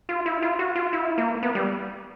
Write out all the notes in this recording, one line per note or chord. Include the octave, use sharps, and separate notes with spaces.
F4
E4
F4
F#4
F4
E4
A#3
B3
G3